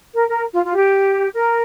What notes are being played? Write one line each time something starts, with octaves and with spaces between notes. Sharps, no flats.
A#4
A#4
F4
F4
G4
A#4